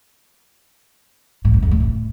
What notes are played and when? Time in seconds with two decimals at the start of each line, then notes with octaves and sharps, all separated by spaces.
1.45 A2
1.54 F2
1.62 E2
1.71 A#2
1.80 A2